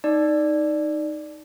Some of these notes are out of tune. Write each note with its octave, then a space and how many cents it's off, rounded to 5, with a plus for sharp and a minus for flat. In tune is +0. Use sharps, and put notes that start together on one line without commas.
D#4 +0 D5 +0